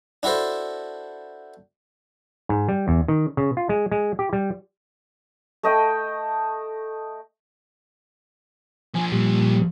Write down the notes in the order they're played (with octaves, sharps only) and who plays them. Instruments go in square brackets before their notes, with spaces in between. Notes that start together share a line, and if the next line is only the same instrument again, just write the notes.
[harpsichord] D4 E4 F#4 A4 C5
[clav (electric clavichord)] G#2
G3
E2
D#3
C#3
F4
G#3
G#3
G4
G3
[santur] A3 D#5 G5
[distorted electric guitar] F3 D4 [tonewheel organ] G#5
[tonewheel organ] A#2 G3